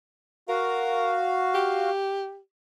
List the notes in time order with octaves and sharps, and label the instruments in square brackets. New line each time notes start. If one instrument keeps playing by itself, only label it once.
[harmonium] F#4 F5 [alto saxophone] A#4
[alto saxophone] G4